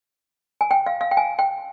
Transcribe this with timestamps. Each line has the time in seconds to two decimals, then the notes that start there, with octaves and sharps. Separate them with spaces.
0.61 G#5
0.71 G5
0.86 F5
1.01 F5
1.11 G5
1.17 G#5
1.39 G5